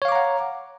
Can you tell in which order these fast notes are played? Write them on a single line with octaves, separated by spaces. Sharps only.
C#5 F5 D6 A#5 F#5